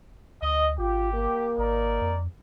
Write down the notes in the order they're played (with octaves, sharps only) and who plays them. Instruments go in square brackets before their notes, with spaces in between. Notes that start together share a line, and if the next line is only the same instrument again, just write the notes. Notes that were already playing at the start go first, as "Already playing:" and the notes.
[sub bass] D2 [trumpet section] D#5
[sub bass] G#1 [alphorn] F4 [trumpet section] G4
[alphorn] A#3
[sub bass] G#1 [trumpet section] D#4 A#4 D5
[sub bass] F2